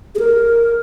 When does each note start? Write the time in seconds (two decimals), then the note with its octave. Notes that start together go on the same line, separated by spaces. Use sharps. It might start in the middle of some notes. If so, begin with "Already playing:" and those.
0.15 G#4
0.19 A#4